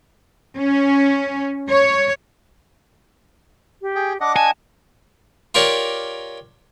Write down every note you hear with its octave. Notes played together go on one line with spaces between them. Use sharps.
C#4
C#5
G4
G#4 G5
D4 D#5 F#5 D6
G#5 A5
F4 G4 A#4 C#5 D5